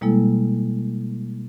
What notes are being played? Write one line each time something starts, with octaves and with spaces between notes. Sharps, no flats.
B2 G3 G#3 A#3 E4 A4